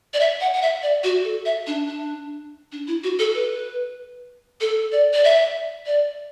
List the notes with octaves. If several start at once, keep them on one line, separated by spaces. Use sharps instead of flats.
D5
E5
F#5
F#5
E5
D5
F#4
A4
E5
D4
D4
D4
E4
F#4
A4
B4
A4
D5
D5
E5
D5